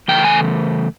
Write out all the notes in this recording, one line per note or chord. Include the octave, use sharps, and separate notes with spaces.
C#3 E3 A3 G5
G#5